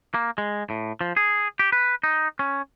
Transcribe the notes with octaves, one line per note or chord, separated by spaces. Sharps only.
A#3
G#3
A2
F3
G#4
G4
B4
D#4
C#4